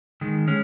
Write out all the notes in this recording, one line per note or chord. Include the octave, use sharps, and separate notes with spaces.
D#3 G#3
G#3 C#4